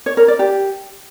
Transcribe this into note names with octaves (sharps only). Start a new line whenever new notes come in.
C#5
A#4
D5
G4